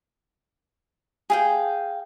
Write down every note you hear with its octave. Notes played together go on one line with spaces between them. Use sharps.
G#4 F5 G5